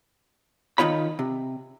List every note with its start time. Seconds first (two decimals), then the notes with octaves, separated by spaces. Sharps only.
0.78 D#3 D#4 F4 C#5 B5
1.19 C3